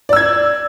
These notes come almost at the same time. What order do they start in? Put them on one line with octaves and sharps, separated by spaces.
D5 E6 G#6